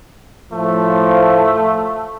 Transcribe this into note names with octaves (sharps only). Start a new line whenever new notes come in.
A2 F3 A3